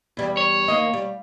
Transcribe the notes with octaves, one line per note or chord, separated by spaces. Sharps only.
E2 G3
C#5
D#2 A#3 D#5
G3